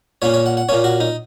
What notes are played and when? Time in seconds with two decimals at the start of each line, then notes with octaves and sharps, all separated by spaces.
0.22 A#2 A#3 C#4 C#5
0.34 C#5
0.46 F#5
0.57 F#5
0.69 A#2 A#3 C#4 C#5
0.84 F#4
1.00 D#4